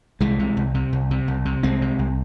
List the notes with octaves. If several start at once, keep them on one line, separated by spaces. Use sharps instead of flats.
C2 E3 G#3
C3
C2
C3
C2
C3
C2
C3
C2 G#3 C4
C3
C2